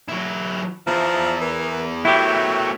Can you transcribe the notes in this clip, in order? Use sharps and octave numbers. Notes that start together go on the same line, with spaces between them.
F#3 E4
E2 F3 E4 E5 A5 A#5
E3 A#4
F#3 A3 B3 E4 G4 E5 G5 C#6